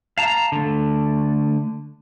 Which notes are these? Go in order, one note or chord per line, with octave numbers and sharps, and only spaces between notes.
F5 A5 A#5
D3 A3